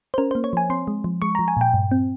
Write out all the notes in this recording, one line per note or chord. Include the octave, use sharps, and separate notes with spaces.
C5
C#4 A#4
A#3 C5
C#5
F3 G#5
C4 C6
G#3
F3
G#3 C#6
F3 A#5
G#5
A#2 G5
G2
C4